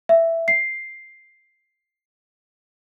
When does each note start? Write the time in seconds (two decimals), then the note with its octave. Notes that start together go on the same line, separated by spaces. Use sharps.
0.09 E5
0.48 C7